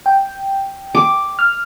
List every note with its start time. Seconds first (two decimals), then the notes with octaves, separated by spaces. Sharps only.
0.06 G5
0.95 D6
1.39 F6